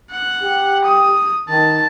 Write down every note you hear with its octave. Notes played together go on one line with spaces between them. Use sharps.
F#5
G4
D#6
D#3 A5